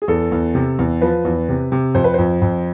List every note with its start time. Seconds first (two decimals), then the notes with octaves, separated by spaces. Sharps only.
0.02 G#4
0.08 E2 A4
0.32 E2
0.55 C3
0.78 E2
1.01 F3 B4
1.25 E2
1.49 C3
1.72 C3
1.94 F2 C5
2.04 B4
2.14 F2 C5
2.42 F2